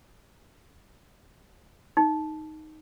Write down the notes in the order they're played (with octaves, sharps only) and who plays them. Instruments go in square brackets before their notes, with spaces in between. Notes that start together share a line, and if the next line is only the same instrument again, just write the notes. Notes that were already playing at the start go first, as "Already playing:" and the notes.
[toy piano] D#4